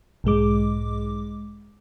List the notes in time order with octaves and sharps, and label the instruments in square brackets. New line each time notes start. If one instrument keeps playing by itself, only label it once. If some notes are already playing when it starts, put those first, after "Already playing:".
[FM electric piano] B1 G#2 G#3 D6